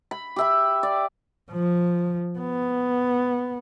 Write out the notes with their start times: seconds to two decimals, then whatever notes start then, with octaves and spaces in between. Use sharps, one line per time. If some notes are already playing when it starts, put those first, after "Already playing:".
0.11 B5
0.36 G4 E5 B5
0.83 D5
1.51 F3
2.39 B3